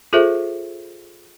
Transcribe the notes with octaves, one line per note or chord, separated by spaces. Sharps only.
F4 G#4 A4 C5 E5 C#6